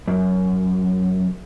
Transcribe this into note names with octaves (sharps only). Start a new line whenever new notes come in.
F#2